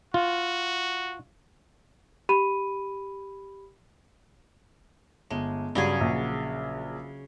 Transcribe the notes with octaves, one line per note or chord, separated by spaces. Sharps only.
F4 F#4
G4 B5 D#7
G1 G#3
G2 C#3 F#3 G#4
A#1